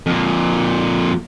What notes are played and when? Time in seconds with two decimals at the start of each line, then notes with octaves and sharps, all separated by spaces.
0.06 F2 A#2